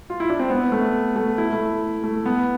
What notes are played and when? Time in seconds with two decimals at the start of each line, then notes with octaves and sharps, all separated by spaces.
0.10 F4
0.20 E4
0.30 D4
0.39 C4
0.50 B3
0.72 A3
1.16 A3
1.38 E4
1.53 A3
2.04 A3
2.26 B3